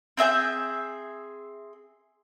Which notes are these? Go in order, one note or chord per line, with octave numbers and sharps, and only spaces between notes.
C4 G#4 E5 G6